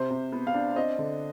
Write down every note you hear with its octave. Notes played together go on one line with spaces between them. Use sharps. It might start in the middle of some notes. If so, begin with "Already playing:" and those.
Already playing: C3 C5
C3
B3
F5
D4
C4 D#5
D3